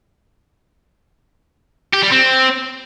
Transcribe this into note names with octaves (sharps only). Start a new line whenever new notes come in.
G4
G3
C4